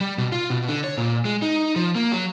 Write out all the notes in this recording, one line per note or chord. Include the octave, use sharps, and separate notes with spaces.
G3
B2
F4
B2
D3
C#5
A#2
G#3
D#4
F3
A#3
F#3